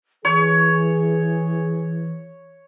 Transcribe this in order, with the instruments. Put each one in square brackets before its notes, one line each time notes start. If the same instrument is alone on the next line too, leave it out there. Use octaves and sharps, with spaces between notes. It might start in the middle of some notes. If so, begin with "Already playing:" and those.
[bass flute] E3 [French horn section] G#4 [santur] C#5